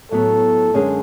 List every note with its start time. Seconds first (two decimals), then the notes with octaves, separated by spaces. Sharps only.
0.11 A2 F#3 B3 A4
0.74 F#2 D3 G#3 C#4 G#4